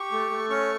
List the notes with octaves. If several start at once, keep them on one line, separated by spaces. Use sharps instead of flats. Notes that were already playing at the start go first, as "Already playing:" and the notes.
Already playing: G4 C#6
A3
A3
C#4 C#6